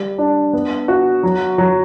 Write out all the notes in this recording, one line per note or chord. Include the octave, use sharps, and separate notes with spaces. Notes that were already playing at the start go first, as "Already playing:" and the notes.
Already playing: G3
D4
B3
F#4
F#3
F#3